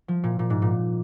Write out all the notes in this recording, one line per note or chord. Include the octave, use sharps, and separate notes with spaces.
F3
A#2
A#2
G#2
A#2